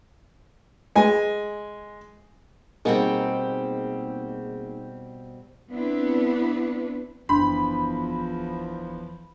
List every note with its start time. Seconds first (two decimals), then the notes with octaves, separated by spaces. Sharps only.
0.95 G#3 G#5
2.85 B2 G3 A#3 C4 D#4 G#4
5.69 B3 C4 D4 E4 B4
7.29 F#1 E2 F3 D4 B5 C6